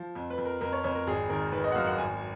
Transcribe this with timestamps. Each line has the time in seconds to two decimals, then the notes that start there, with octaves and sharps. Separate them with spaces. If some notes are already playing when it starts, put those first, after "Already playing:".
Already playing: F3
0.15 F2
0.30 B4
0.38 F2
0.45 A#4
0.61 F2 A#4
0.73 C#5
0.84 F2 C#5
0.95 A#4
1.07 G#1 G#4
1.29 D#3 A#4
1.52 D#3 B4
1.64 D#5
1.72 F#5
1.75 F#2 F5
1.87 F#5
1.98 G#1 G#5